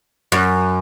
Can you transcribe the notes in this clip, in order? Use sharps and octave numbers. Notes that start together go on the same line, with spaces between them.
F#2